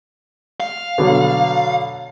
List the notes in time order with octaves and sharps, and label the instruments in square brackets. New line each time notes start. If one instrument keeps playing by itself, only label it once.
[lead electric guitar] F5
[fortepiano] B2 D3 F#3